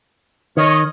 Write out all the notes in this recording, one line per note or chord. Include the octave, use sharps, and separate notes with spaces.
D#3 C#5 D#5